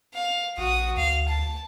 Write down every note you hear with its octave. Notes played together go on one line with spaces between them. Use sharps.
F5
A#1 F#4 D#6
D2 F5
A5